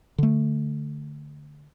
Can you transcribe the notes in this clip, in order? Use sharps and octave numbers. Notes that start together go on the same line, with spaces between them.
D3 A3